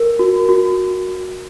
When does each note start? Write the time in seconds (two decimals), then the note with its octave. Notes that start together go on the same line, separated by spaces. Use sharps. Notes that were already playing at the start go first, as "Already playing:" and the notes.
Already playing: A#4
0.19 F#4
0.49 F#4